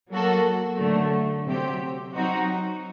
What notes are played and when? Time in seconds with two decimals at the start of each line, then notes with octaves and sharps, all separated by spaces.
0.10 F#3 A#3 F#4 A4
0.78 D3 F#3 A3
1.45 C3 F#3 C4 G4
2.14 F#3 C4 D#4 F#4